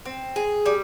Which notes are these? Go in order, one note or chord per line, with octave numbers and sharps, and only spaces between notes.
C4
G#4
G3